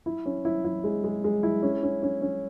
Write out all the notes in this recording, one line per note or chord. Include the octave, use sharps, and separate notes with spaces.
E4
C#4
E4
E4
G#3
G#3
G#3
E4
C#4
C#4
C#4
C#4